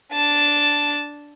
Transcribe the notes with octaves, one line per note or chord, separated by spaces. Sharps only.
D4 A5